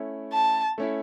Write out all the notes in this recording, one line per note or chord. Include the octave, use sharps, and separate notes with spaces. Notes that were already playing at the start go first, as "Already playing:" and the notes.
Already playing: A3 C#4 E4
A5
A3 C#4 E4